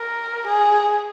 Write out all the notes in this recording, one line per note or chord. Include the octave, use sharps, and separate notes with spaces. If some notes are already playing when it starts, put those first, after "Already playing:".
Already playing: A#4
G#4